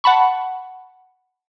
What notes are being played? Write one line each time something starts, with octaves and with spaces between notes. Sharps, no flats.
F#5 A5 B5 C#6